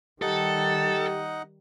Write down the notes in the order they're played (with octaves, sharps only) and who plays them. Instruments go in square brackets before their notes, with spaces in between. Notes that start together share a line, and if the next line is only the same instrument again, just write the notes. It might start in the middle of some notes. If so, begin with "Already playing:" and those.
[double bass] D#3 G3 [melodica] D#4 D#5 F#5 [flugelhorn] G4 [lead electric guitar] A4